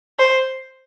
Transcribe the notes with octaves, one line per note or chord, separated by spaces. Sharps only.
C5